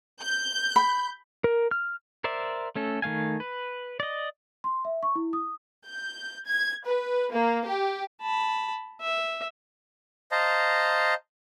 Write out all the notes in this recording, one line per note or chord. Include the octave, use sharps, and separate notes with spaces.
G6
B5
A#4
F6
A#4 C5 D5 E5
A3 C#4 A4
D#3 A3 F5 G#5
B4
D5 D#5
C6
E5
C#6
E4
D#6
G6
G#6
B4
A#3
G4
A5 B5
E5
C5 D#5 F5 A5 A#5